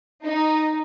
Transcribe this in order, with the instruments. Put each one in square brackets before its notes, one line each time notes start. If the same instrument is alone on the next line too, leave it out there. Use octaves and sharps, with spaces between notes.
[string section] D#4